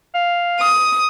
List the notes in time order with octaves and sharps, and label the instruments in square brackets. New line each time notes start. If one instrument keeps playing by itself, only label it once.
[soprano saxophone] F5
[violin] D#6